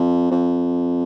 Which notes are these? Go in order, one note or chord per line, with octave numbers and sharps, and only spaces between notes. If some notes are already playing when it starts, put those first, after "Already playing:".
Already playing: F2
F2